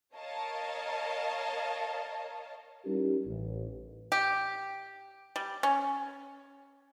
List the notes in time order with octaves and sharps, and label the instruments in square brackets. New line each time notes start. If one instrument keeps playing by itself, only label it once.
[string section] A#4 C#5 D#5 F5 A5
[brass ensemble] G3 C#4 D#4 E4 G4 A#4
A1
[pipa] G4
G3
C#4